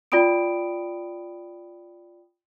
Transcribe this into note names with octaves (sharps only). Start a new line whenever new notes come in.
F4 D5 G5 B5 D#6 D7